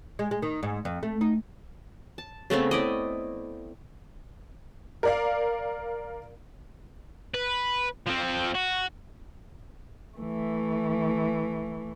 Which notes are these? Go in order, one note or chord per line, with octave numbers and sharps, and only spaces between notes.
G#3
G#3
D#3
G#2
F2
A3
D#4
A5
C#3 A3 B3 C4
E4 D5 D#5
A#4 D5 F5
B4
F3 C4
F#4
E3 A3